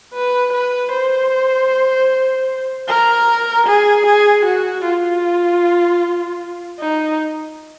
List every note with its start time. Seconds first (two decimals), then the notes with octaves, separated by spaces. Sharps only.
0.14 B4
0.53 B4
0.93 C5
2.88 A#4
3.66 G#4
4.06 G#4
4.45 F#4
4.84 F4
6.80 D#4